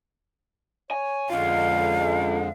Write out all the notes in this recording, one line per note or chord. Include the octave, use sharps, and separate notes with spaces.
C#5 G#5
F2 D3 G#3 C#4 F4 F5